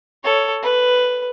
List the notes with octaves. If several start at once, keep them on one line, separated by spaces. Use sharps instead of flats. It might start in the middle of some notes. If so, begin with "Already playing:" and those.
A4 C#5
B4